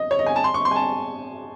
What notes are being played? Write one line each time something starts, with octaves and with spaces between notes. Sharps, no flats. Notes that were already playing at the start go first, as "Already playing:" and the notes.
Already playing: D#5
C#5
D#5
G#5
A5
C6
C#6
C6
G#5
A5